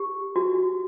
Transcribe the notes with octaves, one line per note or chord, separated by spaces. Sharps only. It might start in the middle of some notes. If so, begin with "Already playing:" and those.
Already playing: G4
F#4